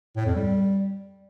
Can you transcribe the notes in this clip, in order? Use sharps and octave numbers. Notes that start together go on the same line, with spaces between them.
A2
F2
G3